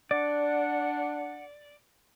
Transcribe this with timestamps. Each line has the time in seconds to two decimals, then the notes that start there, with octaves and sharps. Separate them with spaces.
0.11 D4 D5 F#5